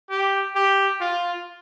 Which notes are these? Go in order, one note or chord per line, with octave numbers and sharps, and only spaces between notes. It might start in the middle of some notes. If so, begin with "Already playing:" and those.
G4
G4
F4